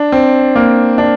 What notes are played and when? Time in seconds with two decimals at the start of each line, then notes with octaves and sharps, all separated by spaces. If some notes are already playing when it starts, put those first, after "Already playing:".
Already playing: D4
0.12 C4
0.56 A#3
0.98 D4